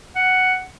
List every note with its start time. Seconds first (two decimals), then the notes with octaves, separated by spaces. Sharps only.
0.16 F#5